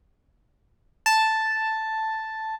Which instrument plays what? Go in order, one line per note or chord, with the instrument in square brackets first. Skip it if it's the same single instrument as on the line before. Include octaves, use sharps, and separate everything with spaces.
[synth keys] A5